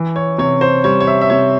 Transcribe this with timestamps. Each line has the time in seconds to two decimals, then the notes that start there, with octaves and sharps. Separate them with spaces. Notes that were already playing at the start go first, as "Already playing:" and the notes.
Already playing: E3
0.16 C#5
0.38 C3 C#5
0.61 C5
0.84 G3 C#5
1.01 C#5
1.07 E5
1.21 E5
1.30 C3 C#5